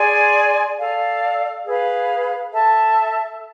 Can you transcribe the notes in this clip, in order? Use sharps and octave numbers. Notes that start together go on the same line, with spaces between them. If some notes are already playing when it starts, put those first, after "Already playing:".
Already playing: G#4 D5 G#5 C6
A4 D5 F5
G#4 B4 F5
A4 E5 A5